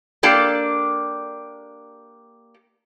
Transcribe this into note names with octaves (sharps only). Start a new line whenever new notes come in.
A#3 D4 G4 A4